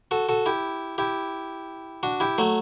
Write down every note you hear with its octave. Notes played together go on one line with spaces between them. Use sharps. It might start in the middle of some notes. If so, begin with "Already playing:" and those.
F#4 A4
F#4 A4
E4 G4
E4 G4
D4 F#4
E4 G4
F#3 A3